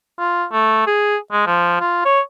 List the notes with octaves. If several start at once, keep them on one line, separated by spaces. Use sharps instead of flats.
F4
A3
G#4
G#3
F3
F4
C#5